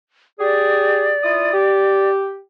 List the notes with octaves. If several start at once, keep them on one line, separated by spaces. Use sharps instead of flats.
G4 G#4 D5
E4 F4 D#6
G4